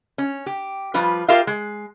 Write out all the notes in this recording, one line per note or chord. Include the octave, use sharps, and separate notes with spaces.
C#4
G4
F3 G3 F4 B4
F4 G4 A#4 E5 F5
G#3